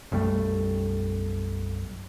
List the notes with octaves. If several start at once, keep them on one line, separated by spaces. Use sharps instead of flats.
B1 F#2 G3 A3